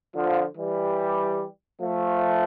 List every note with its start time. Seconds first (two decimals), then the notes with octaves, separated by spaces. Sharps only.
0.15 D3 F3
0.57 E3 G3
1.81 F3 A3